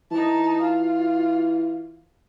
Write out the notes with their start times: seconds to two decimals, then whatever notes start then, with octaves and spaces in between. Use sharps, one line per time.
0.11 E3 D#4 A5
0.62 F4